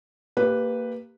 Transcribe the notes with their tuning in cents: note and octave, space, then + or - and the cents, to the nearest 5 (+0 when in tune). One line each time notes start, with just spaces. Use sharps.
A#3 -20 G4 +0 B4 +0